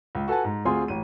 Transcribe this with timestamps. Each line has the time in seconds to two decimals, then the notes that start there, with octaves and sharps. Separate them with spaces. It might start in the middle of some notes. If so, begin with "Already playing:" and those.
0.15 C#2
0.28 F#4 A4 B4 G#5 A5
0.45 G#2
0.65 D2 C4 F4 G#4 G#5 C6
0.88 A1 D#7